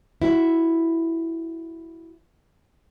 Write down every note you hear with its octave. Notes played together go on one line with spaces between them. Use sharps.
E4 F#4